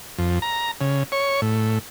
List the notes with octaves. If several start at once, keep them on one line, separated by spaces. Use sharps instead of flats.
F2
A#5
C#3
C#5
A2